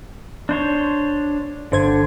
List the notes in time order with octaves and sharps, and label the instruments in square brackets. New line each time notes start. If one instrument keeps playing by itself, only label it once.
[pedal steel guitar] D4 C5 C#5
[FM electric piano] G1 C5 G#6 [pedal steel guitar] D3